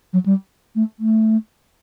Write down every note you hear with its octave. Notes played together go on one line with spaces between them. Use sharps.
F#3
G3
A3
A3